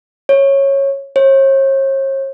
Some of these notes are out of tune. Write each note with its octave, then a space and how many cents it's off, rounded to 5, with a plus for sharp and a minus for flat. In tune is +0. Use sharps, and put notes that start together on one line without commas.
C#5 -10
C#5 -45